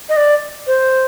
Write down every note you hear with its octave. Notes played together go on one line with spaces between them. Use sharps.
D#5
D5
C5